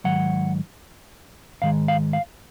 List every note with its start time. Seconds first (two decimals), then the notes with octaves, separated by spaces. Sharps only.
0.04 G#2 D#3 F#3 F#5
1.62 G#2 D#3 G#3 F5
1.88 F5
2.13 F5